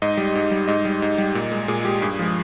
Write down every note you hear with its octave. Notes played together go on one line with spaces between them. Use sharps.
G#2 D#5
G3
G#2
G3
G#2 D#5
G3
G#2
G3
A#2
G#3
A#2 G#4
G#3 G4
G2 G#4
F3 G#3